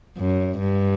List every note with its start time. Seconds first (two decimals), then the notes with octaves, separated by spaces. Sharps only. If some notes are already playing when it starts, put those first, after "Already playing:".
0.18 F#2
0.59 G2